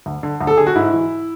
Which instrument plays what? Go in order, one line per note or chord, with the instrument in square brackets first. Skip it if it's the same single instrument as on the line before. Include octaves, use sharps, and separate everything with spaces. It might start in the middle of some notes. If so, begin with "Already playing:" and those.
[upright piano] D2
D3
D2
A4
D3 G#4
F#4
G#2 E4
E3